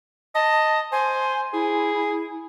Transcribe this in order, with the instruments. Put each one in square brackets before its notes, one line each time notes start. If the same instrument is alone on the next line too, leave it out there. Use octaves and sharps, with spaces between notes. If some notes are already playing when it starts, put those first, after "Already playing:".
[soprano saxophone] D#5 [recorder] A5
[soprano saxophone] C5 [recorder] G#5
[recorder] E4 [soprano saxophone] G#4